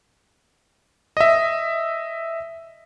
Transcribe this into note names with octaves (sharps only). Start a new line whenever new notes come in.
D#5 E5